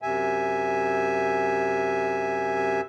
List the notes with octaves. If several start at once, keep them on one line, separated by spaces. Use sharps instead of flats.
F#2 C3 E5 G#5